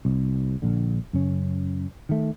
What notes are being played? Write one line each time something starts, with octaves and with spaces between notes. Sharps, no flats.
C2
A#1 D3
F#2 C#3 C#4
D#3 A3